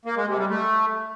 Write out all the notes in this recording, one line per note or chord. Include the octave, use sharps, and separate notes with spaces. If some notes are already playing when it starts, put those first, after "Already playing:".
A#3
G#3
C3
G3
A3